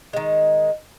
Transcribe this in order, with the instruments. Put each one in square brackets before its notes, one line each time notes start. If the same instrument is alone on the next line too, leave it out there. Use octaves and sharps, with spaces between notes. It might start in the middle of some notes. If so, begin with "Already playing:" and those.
[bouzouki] D#3 G#3